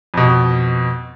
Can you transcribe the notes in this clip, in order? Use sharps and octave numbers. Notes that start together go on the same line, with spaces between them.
F2 B2